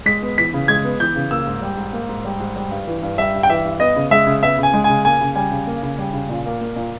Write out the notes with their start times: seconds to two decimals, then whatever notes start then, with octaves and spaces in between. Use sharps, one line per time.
0.06 G#3 B6
0.22 B3
0.38 E3 B6
0.54 C#3
0.68 G#3 G#6
0.84 B3
1.00 E3 G6
1.16 C#3
1.31 A#3 E6
1.47 G#2
1.62 G3
1.77 G#2
1.93 A#3
2.09 G#2
2.25 G3
2.40 G#2
2.56 G3
2.71 G2
2.87 E3
3.02 G2
3.18 G3 E5
3.34 G2
3.43 G5
3.49 E3 E5
3.64 G2
3.80 B3 D#5
3.96 C#3
4.11 G#3 E5
4.27 C#3
4.42 B3 E5
4.58 C#3 G#5
4.73 G#3
4.84 G#5
4.90 C#3
5.04 A#3 G#5
5.21 C#3
5.35 G3 G#5
5.51 C#3
5.67 A#3
5.83 C#3
5.99 G3
6.13 C#3
6.29 A#2
6.46 A#3
6.61 A#3
6.76 A#2